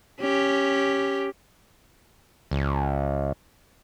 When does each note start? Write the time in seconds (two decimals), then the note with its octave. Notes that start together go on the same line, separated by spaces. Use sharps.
0.21 C#4 G4
2.51 C#2